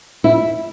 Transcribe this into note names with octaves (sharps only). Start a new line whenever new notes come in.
E4